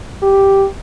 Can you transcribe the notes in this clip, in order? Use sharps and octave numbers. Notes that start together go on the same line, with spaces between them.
G4